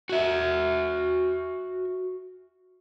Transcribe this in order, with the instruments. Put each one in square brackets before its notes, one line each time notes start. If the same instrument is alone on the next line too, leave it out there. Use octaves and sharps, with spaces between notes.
[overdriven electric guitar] F#4 E5